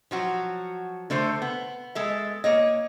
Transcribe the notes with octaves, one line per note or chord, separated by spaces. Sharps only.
F3 F#3 F#4
D3 A3 A4 C5
B3
G#3 A4 E5
A#3 C#5 D#5